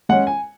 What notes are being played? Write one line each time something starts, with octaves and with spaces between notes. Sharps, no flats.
G#3 C#4 F#5
G#5